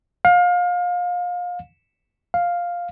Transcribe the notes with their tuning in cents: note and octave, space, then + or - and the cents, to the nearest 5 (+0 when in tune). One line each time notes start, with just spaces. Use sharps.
F5 +30
F5 +5